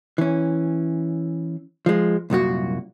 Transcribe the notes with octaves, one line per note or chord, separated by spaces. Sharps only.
E3 C#4
F3 G#3
C2 F#2 A#2 F#4